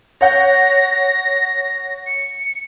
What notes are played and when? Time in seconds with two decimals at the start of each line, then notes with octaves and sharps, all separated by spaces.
0.21 C#5 F#5 G6 A#6
2.06 C#7